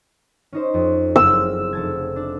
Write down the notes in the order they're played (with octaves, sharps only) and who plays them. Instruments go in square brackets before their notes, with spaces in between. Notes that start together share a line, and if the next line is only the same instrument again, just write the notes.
[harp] C#4 D#4 C5
F2
[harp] F#1 C4 F6 [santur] E6
[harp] F1 A5 G#6
D4